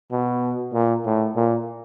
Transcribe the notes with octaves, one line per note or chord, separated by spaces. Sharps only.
B2
A#2
A2
A#2